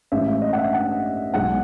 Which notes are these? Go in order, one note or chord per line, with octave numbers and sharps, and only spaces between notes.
A1 A2 G#3 E5
E5
D#5
F#5
E5
F#5
B1 B2 G#3 F#5